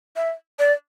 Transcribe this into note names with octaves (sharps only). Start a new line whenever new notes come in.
E5
D5